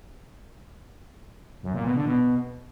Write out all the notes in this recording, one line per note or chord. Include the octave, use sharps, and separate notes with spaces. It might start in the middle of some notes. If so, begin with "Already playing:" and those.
F#2
A#2
B2
D3
B2